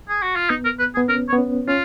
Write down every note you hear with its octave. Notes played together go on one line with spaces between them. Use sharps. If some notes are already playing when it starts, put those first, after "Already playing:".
G#4
F#4
F4
B3 D#4
A#4
B4
B3 G#4
C#4 A#4
C#5
B3
C#4
C#4 F4